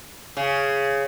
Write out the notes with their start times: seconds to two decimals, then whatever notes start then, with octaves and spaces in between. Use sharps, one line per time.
0.37 C#3